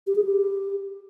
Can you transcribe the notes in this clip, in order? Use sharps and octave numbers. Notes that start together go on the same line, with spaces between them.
G4
G#4
G4